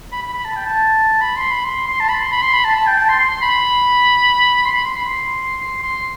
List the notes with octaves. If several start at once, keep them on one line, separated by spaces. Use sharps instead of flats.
B5
B5
B5
A5
G5
A5
B5
C6
B5
C6
C6
A5
B5
C6
B5
C6
B5
A5
A5
G5
A5
C6
C6
C6
B5
C6
B5
C6
B5
C6
C6
C6